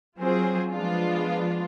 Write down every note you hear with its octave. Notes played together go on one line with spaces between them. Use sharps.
F#3 C4 F4 G#4 C5
F3 G#3 B3 D4 F4